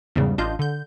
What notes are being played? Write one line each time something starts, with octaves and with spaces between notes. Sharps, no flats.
E2 G#2 C#3 G3
A1 D4 F4 D#5 F5 G6
D3 G6